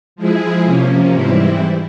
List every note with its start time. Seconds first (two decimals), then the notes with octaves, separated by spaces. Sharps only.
0.16 F3 G#3 E4 G#4
0.64 C3 F3 A#3 C#4
1.13 G#2 E3 G3 C4 E4